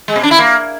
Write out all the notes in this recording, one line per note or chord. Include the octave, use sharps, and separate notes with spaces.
G#3
B2
D4
E4
A#3